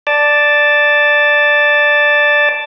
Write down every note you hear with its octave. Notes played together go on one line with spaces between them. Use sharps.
D5 A5 D6